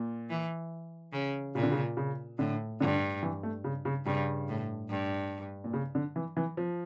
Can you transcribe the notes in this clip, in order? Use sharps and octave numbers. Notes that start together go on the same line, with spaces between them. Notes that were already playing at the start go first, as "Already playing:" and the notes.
Already playing: A#2
E3
C#3
A#2 C#3
D3
C#3
C#3
A2 D3
G2 D3
E3
A3
C#3
C#3
G2 C#3
A2
G2
A#2
C#3
D3
E3
E3
F3